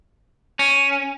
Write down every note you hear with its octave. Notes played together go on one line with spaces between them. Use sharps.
C#4